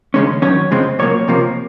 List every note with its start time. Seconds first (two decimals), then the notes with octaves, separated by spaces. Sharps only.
0.14 D#2 C#3 G#3 C#4
0.42 F#2 D#3 F#3 C#4 C#5
0.71 F2 C#3 G#3 C4
0.99 C2 A#2 F#3 A#3 C#5
1.28 C#2 C3 F3 A#3